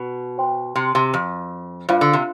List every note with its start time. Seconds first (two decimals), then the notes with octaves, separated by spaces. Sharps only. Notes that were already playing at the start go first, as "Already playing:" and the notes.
Already playing: B2
0.38 C5 G5 C6
0.76 C3
0.95 C3
1.14 F2
1.89 G2 F4 C5 F5 B5
2.01 D3
2.13 C3